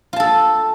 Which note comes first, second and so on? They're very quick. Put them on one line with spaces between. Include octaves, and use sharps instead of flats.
F4 A5 A4